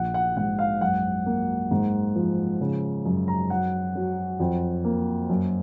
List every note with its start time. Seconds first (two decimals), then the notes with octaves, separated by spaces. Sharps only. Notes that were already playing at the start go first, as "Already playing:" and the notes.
Already playing: A#1 F#5
0.14 F#5
0.37 G#2 F#5
0.59 F5
0.81 F#2 F#5
1.26 A#3
1.71 G#2
2.16 F3
2.61 C#3
3.06 F#2
3.28 A#5
3.50 F#3 F#5
3.95 F#3
4.40 F2
4.84 A#3
5.30 F#2